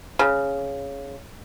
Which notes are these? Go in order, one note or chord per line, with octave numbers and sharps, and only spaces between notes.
C#3